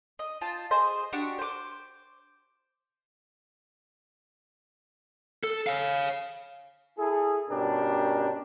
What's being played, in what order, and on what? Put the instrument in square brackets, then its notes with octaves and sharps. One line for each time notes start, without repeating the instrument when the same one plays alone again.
[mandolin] D#5
F4 C5 A5
G#4 C5 D#5
D4 F#4 G4
C5 D6
[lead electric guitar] A4
C#5 F5
[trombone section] E4 G#4 A4
G2 B2 C#4 D4 G4 A#4